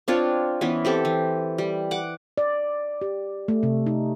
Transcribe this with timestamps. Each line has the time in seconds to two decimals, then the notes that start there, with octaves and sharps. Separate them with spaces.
0.08 C4 D4 F4 C#5
0.61 E3 B3 C#4
0.85 C4 G4 A4
1.05 E3
1.58 G3
1.91 F#5 D6
2.38 D5
3.01 G4
3.48 A3
3.63 C3
3.86 D#4